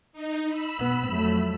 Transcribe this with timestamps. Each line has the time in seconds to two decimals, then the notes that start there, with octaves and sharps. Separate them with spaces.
0.13 D#4
0.48 B5 E6
0.80 B2 B3
1.10 F2 F#3 A3